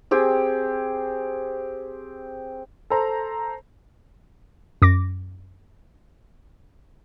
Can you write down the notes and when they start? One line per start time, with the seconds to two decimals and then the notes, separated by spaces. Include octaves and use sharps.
0.11 C4 G4 G#4 G#5
2.90 A4 C5 A#5
4.82 F#2 D6 A#6